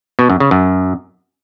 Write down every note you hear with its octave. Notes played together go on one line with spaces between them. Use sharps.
B2
F#2
C#3
F#2